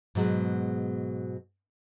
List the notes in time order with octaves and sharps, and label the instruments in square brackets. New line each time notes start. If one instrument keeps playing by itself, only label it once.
[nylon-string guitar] G#2 B2 F#3 G#3